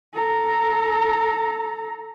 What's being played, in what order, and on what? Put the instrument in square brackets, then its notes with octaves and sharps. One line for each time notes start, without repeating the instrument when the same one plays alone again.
[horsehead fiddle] A4 A#5